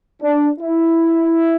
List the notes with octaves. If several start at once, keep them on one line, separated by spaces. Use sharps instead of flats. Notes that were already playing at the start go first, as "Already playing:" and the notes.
D4
E4